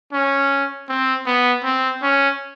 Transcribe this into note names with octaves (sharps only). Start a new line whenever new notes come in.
C#4
C4
B3
C4
C#4